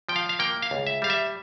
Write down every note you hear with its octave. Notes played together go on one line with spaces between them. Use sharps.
F3 G5
F5
F5
A#3 G5
F5
C#2
E5
G3 F5
E5